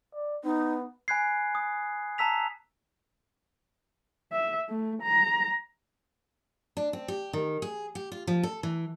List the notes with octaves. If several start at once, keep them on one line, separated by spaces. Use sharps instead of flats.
D5
B3 D#4
G#5 B5 F#6 G#6 C7
D#6
A5 A#5 E6 B6 F7
E5
A3
A#5
D4
C4
G4
D#3
G#4
G4
F4
F3
A4
E3